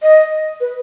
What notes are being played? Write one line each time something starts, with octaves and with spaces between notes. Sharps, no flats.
D#5
B4